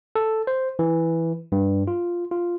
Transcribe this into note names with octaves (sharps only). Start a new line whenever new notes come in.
A4
C5
E3
G2
F4
F4